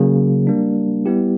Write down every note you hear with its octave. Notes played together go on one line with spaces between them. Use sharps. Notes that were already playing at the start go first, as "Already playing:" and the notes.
Already playing: C#3 F#3 A#3
G3 A#3 D4
G3 B3 E4 G4